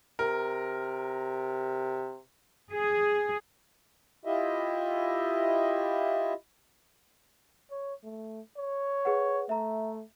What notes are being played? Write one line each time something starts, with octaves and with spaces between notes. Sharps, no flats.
C3 A#4
G#4
E4 F4 G4 D#5 E5
C#5
A3
C#5
G#4 B4 F#5
A3 E5 A#5